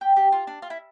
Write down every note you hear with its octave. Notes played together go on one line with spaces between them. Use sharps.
G4
G4
F4
D4
F4
E4